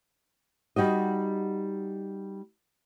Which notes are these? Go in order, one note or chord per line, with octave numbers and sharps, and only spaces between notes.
G3 D#4 F#4 D#5